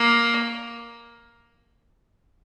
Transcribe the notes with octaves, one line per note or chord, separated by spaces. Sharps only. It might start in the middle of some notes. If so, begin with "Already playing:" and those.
Already playing: A#3